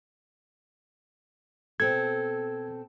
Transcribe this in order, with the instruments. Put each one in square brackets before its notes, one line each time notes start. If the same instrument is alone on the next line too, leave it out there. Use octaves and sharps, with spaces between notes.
[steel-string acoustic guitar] B2 C4 A4 [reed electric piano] G#6